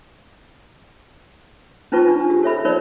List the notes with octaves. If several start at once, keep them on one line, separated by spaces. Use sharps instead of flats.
C#4 D#4 F4 B4 A5 C#6
D4
G4
A4 C#5 E5 B5
D#4 A#4 C#5 D5 B5